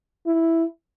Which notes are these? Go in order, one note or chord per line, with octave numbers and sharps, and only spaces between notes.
E4